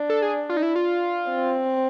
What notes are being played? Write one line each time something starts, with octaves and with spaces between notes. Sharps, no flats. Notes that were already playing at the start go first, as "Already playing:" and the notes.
Already playing: D4
A4
G#4
F4
D#4
E4
F4
C4